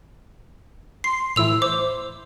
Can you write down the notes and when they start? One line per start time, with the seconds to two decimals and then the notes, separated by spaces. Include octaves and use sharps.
1.04 C6 C7
1.36 A2 E3 E6 F7
1.62 C5 D6